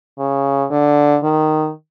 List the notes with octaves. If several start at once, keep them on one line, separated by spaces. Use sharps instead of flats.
C#3
D3
D#3